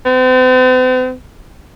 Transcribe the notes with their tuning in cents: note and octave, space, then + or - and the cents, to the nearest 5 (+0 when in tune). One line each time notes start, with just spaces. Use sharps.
C4 -45